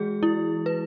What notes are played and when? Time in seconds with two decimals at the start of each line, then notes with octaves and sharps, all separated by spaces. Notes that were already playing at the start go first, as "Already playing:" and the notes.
Already playing: E3 G#3 F#4 G#4
0.23 E4
0.66 B4